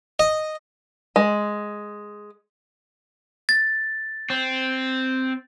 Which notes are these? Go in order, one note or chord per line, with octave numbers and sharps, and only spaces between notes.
D#5
G#3
A6
C4